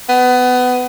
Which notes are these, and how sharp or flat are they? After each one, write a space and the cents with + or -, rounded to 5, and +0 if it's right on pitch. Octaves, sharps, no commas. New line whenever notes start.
B3 +20